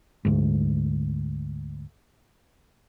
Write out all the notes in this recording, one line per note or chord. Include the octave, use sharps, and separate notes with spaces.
D2 G#2